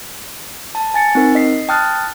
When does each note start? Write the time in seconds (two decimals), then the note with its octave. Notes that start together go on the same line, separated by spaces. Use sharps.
0.75 A5
0.94 G#5 A6 C#7
1.15 C4 D#4 A#4
1.35 D#5 B6 C7
1.69 G5 A5 D#6 F6 F#6 A6